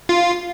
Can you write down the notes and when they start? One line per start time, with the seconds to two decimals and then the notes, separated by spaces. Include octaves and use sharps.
0.09 F4